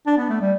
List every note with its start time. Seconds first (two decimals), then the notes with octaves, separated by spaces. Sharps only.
0.07 D4
0.17 B3
0.30 A3
0.41 G3